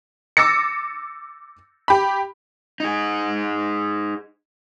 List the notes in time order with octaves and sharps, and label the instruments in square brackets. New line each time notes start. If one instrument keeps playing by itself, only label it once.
[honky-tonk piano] D6 E6 A6 A#6 C#7
G4 B5
[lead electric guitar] D#4 G#4